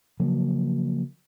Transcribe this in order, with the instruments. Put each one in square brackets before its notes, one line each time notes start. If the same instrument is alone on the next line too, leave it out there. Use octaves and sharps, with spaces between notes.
[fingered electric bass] C#3 F3 F#3 A#3